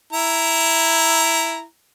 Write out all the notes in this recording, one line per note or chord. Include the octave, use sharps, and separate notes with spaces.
E4 A#5